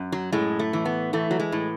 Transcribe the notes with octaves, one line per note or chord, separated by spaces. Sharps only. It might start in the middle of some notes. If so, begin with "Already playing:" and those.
Already playing: F#2
F#3
A2 G#3
A3
E3
B3
E3 A3
F#3
G#3
A2